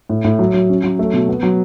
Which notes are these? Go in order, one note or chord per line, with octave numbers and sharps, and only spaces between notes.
A2
A2
F#3
F#3
C#4
F#3
A3
B2
B3
F#3